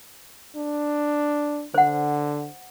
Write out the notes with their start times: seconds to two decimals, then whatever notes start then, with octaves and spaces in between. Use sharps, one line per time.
0.56 D4
1.74 D3 C5 F#5